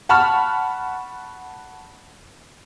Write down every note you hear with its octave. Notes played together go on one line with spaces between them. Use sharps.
F#5 A5 B5 C#6 F6